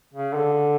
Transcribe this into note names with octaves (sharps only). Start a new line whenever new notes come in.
C#3
D3